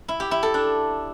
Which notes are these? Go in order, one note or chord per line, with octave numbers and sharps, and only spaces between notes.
E4
G4
E4
A4
D4